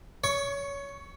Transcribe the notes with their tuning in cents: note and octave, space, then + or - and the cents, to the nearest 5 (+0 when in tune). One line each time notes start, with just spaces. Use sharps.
C#5 +25 C#6 +0